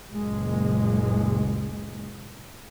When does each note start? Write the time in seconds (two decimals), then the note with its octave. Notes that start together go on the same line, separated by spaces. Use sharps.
0.14 F#1 C#2 A#2 G#3